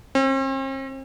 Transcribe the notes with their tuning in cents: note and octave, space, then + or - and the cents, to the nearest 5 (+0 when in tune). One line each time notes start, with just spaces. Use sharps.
C4 +45